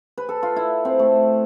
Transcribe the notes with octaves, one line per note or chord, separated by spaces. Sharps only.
B4
A4
F4
E4
C4
A3